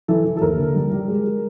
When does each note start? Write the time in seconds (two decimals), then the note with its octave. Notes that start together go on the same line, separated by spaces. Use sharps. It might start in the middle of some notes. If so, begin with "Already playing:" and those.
0.08 E3 A4
0.25 E3
0.37 A4
0.42 D#2 A#4
0.58 D3
0.75 G3
0.92 G3
1.08 G#3
1.25 G#3